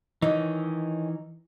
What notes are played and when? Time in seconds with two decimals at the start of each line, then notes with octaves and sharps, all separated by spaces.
0.22 D#3 E3 C#4 D#4